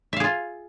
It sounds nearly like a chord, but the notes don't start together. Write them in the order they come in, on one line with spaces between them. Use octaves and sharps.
E5 F5 G#4 F4